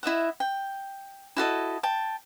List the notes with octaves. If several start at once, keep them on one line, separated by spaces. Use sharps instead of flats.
E4 D#5 E5 F#5
G5
E4 F#4 A4 D#5
G5 A5